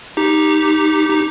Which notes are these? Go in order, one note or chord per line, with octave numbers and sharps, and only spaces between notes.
D#4 G4
D#4